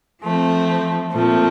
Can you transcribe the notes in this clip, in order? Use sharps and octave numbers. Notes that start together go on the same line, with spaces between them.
F3 A3 C4
A#2 F3 A3 C4